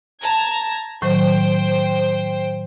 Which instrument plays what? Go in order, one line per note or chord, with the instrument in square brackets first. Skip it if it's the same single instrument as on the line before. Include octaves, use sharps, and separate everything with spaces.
[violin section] A5 A#5 G#6
[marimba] A2 D#3 F#3 [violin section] C5 G5